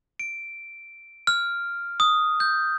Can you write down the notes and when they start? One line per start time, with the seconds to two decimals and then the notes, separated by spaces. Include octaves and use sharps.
0.19 D7
1.27 F6
2.00 D#6
2.40 G6